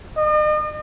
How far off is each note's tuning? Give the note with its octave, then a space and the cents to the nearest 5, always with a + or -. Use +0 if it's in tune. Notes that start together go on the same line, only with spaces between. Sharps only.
D#5 -40